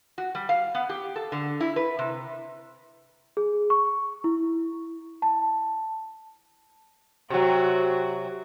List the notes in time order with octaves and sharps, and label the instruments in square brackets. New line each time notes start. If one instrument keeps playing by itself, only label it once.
[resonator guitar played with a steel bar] F#4
G3
F5
B3
G4
A4
D3
E4
B4
C3
[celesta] G#4
C#6
E4
A5
[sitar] C3 F#3 [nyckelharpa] F#4